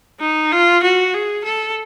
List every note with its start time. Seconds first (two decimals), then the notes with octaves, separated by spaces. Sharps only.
0.21 D#4
0.52 F4
0.83 F#4
1.14 G#4
1.44 A4